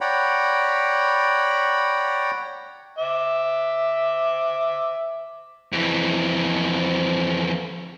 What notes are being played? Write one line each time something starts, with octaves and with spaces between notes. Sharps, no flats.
C#5 D5 F#5 G5 A#5 B5
E5 D6
F2 E3